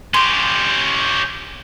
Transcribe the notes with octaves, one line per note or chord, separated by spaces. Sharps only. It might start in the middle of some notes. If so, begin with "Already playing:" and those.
C#4 G4 C6